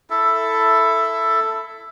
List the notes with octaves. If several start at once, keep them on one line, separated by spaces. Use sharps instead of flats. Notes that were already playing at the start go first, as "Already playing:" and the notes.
E4 A4 E5